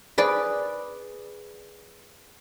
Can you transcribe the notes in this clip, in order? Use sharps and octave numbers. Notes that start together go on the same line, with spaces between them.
G#4 B4 D5